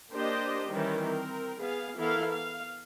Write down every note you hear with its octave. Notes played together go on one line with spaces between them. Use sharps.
A#3 D4 G4 C5 D#5
D#3 E3 G3 C#4
C4 A#4
B3 G#4 F5
E3 B3 E4 A4 A#4 F5
F5